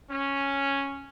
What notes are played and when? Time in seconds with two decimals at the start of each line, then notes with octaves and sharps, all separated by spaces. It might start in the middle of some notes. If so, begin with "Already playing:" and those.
0.10 C#4